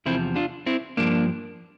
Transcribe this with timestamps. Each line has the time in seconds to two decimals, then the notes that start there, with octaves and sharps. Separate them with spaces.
0.06 E2 C3 F3 C4 E4
0.36 D4 F4
0.66 C4 E4
0.97 G2 F3 A#3 D4